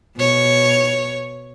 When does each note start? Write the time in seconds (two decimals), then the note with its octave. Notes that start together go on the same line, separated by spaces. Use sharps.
0.17 B2 C#5